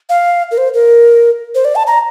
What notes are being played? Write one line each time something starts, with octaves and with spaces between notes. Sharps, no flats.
F5
A#4
C5
A#4
C5
D5
A5
A#5